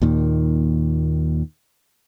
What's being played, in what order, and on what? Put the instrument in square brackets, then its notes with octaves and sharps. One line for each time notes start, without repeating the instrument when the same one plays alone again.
[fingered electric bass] D#2 A#2 D#3